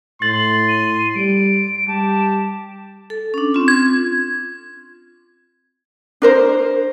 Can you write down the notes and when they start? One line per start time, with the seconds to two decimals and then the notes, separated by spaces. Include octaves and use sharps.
0.22 A2 C6 A6 F#7
0.68 D#7
1.15 G3 D7
1.88 G3 G4 A5
3.10 A4
3.34 C#4 D4
3.54 C4 F4
3.68 G#6
6.22 D4 A#4 C5